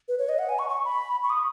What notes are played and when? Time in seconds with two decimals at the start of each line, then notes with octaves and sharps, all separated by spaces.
0.08 B4
0.19 C#5
0.29 D#5
0.39 F#5
0.49 G#5
0.59 C#6
0.69 C#6
0.85 B5
1.23 C#6
1.30 D#6